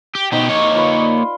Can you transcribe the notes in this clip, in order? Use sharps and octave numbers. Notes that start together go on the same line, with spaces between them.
G4
B2 D#4 G4 C5 D#5
A#3 C#5
F4 B4
D5
C6